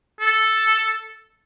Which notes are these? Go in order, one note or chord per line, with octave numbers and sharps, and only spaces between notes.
A4